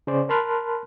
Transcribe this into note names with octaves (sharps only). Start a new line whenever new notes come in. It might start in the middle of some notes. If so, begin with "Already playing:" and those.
C#3 C#4 C5 D5
A#4 A5 B5 C6 F6 F#6